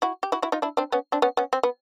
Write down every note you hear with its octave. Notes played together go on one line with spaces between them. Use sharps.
E4 F#4
G4
E4 F#4
E4 F#4
D#4 F4
D4 E4
C4 D4
B3 C#4
C4 D4
B3 C#4
B3 C#4
C4
B3